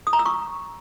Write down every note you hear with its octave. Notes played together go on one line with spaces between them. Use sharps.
D#6
A#5
E6
C#6